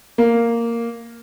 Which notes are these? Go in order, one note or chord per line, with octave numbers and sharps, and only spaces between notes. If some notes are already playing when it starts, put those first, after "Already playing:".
A#3